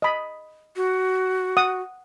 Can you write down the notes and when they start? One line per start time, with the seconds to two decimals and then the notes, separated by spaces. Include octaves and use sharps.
0.02 D#5 B5
0.76 F#4
1.57 F#5 D#6